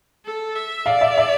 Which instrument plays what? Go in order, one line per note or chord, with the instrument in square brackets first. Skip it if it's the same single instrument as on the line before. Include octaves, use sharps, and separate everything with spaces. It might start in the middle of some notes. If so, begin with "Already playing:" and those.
[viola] A4
E5
[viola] D5 [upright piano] F5
[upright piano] E5
E5